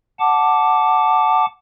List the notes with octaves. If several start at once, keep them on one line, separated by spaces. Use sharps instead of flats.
F#5 A5 D6